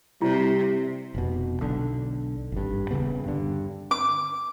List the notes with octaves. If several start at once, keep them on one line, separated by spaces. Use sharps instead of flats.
C3 G3 E4
F1 B2
B1 D3
G#1 G2
D#1 F2 C#3 B3
G2 D3
D6